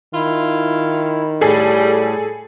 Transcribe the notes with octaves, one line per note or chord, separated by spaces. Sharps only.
D#3 E4 F4
A2 G3 G#4 A4